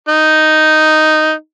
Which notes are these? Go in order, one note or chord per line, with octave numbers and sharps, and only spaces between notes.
D#4